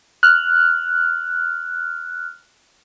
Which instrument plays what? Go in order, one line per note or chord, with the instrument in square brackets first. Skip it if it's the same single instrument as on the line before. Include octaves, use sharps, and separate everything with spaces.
[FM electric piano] F6 F#6